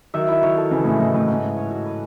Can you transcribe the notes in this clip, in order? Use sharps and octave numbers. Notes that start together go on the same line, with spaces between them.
D#3 F#3 E5
E4
D#3 F#3 C#5
A4
C#3 E3 E4
A2 C#3 E4
A2 D#5
A2 B4
G#2 C#4
C#4
C#5
F#4
B4